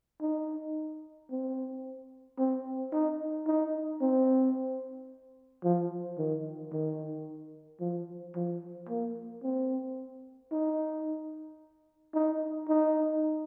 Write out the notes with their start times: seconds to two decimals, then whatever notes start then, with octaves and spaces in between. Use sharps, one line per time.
0.22 D#4
1.31 C4
2.39 C4
2.93 D#4
3.47 D#4
4.01 C4
5.64 F3
6.18 D#3
6.72 D#3
7.80 F3
8.35 F3
8.89 A#3
9.43 C4
10.52 D#4
12.14 D#4
12.69 D#4